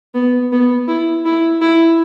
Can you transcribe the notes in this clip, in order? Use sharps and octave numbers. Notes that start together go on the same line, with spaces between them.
B3
B3
E4
E4
E4